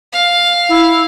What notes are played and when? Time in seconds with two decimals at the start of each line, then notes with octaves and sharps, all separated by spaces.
0.13 F5
0.69 E4